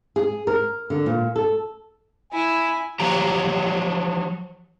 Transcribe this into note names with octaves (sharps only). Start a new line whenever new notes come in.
G#4
A#4
D3
A#2
A4
E4 G#5
F3 F#3 G4 A#5